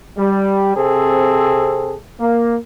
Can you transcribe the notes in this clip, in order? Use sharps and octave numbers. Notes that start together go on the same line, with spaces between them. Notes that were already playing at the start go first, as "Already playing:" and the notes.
G3
C3 C4 G#4 A4
A#3